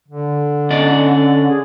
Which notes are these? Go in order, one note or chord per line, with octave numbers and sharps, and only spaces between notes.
D3
C#4 D5 D#5
G#4